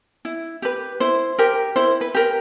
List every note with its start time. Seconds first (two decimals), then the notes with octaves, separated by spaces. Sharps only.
0.25 E4
0.62 G4 B4
1.00 E4 C5
1.38 G4 A#4
1.76 E4 C5
2.01 B4
2.14 G4 A#4